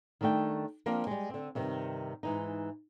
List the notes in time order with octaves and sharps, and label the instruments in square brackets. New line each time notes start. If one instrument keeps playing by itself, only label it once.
[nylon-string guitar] D#3 G3 A3 D4 G5
F3 A#3 C4 D4
G3 G#3
D3 C4
G2 C3 D#3
G#2 E3 D#4